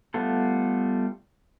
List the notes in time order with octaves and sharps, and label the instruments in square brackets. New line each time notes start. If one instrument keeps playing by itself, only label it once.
[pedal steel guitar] G3 A3 B3 F4 A4